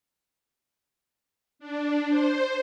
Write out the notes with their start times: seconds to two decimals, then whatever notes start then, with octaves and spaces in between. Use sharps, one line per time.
1.59 D4
2.08 C5